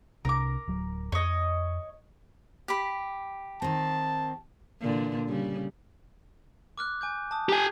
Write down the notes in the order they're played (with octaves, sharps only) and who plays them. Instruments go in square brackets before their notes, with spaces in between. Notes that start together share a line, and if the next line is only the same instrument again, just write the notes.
[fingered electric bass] C2 C3 D4 [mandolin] A#4 D6
[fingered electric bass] D1 F#3
[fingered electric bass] F2 [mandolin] C#5 D#5
[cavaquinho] G4 B5
[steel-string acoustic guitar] D#3 C4 [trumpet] A5
[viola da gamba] A#2 D3 E3
C#3 G3
[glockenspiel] D6 F6 F#6
G#5 D6 G6
A5 D#6
[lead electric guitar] G4 G#5 [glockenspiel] A#5 G6 G#6